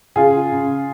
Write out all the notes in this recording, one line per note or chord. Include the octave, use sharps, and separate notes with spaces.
C#3 F4 G#4
C#3